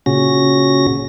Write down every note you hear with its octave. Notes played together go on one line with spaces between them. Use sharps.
A#2 C#3 C#4 F#4 A#6